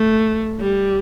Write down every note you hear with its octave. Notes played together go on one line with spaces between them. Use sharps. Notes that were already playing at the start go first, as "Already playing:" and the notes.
Already playing: A3
G3